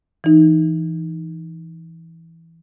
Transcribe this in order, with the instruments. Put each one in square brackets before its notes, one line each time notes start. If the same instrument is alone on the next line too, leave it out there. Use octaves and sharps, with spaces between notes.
[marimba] E3 D#4